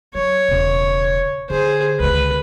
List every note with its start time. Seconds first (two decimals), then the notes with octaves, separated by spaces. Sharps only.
0.15 F#3 C#5
0.48 E1 C#3
1.50 D3 G#4 C5
2.00 C#2 D3 B4